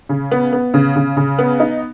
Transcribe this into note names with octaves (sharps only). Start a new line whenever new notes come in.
C#3
B3
B3
C#3
C#3
C#3
B3
D#4